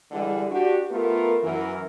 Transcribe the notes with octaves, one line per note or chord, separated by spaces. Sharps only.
D3 E3 G3 G#3
D4 F#4 G4
A3 B3 F4 A#4
F#2 E3 A#4